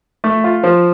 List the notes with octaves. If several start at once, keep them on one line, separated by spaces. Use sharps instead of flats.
A3
F4
F3